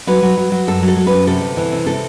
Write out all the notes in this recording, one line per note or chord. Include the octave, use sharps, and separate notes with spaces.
F#3 B4
F#3
F#3
F#3
F#2 A4
F#3
A4
F#3
B4
F#2
C3 A4
D2
E3
C3
C3 A4